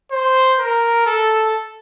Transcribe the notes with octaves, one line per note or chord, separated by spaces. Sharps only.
C5
A#4
A4